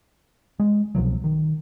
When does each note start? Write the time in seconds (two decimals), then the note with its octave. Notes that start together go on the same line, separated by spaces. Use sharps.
0.60 G#3
0.95 C2 B2 F3 F#3
1.24 D#3